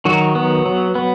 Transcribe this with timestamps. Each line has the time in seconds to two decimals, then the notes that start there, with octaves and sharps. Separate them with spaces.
0.05 D#3 F#3 F#4
0.35 B3
0.66 F#3
0.95 B3